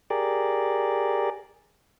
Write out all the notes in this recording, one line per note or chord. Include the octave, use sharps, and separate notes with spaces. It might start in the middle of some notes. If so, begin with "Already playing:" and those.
G4 G#4 A#4 D5